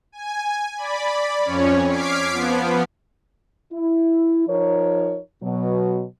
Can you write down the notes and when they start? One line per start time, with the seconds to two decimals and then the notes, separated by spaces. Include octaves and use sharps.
0.12 G#5
0.77 D5 B5
1.44 F2 C#4 C#5
1.90 D6 F6 G#6 B6 C7 D7
2.31 F3 B3
3.72 E4
4.47 F3 D#4 A#4 C#5
5.42 B2 F#3